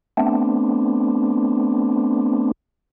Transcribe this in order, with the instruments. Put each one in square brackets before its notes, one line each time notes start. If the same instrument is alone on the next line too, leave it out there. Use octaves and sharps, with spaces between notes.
[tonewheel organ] A3 B3 C4 D4